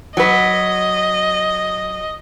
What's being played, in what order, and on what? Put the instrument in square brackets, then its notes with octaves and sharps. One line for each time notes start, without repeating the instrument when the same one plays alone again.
[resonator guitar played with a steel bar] F#3 B4 [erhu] D#5